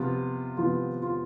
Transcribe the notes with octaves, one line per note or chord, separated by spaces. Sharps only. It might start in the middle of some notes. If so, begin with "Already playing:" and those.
Already playing: C3 F3 B3 F4
C3 F3 B3 F4
F4